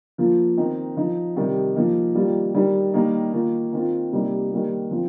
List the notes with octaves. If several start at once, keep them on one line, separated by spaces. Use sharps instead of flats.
F3 A#3 F4
D#3 C4 D#4
F3 D#4
C3 D#3 G3
F3 A#3 D#4
D#3 G3 A#3 F4
D#3 G3 D#4
D#3 G3 A#3 D#4
D#3 A#3 F4
D#3 C4 F4
C3 G3 A#3 D#4
D#3 G3 A#3
F3 C4 F4